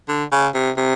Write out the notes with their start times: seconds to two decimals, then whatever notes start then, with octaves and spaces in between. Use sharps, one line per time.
0.08 D3
0.32 C#3
0.55 C3
0.77 C3